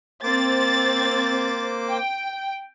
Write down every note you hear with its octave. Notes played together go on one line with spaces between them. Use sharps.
A#3 C4 C5 D6 A6
G5